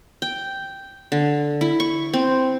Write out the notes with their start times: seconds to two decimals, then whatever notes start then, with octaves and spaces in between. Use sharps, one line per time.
0.22 G5
1.12 D3
1.61 E4
1.80 C#6
2.14 C4